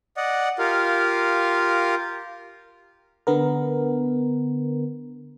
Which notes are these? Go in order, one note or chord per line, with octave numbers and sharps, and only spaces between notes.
D5 D#5 F#5
F4 G4 A#4 F5
D3 B3 A#4